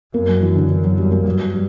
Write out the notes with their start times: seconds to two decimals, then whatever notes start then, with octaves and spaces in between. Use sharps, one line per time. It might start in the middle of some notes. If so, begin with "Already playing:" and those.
0.14 F#2 A#3
0.28 F#3
0.42 E3
0.56 D3
0.70 E3
0.84 F#3
0.98 G3
1.11 A#3
1.25 G2 F#3
1.53 G3